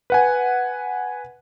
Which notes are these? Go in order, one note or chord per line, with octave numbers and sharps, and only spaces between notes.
B4 F#5 G#5